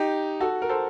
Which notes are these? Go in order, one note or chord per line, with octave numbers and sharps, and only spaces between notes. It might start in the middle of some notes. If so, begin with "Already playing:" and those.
Already playing: D#4 G4
F#4 A4
A#4
A4 C5